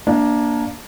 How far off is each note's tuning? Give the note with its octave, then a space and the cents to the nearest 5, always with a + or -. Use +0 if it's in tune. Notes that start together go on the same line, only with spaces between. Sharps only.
A#3 +15 D4 +0 E5 -30